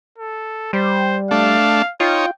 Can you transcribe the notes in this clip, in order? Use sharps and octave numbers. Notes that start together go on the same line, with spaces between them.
A4
G3 C5
A3 D4 F5
D#4 F4 C#5 G5